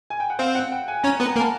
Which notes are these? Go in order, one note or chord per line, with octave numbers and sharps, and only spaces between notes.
G#5
G5
F#5
C4 C5 F5
F#5
G5
G#5
C#4 C#5 A#5
B3 B4
A#5
A#3 A#4
A5